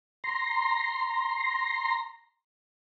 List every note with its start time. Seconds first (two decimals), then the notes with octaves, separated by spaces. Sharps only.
0.24 A#5 C6